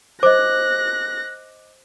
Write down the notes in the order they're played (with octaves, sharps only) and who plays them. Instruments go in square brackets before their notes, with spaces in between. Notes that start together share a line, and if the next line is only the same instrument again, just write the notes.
[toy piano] C5 [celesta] D#5 D6 [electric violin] F#6 A#6